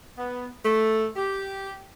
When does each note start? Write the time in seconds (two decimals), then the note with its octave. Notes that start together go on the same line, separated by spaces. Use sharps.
0.17 B3
0.64 A3
1.16 G4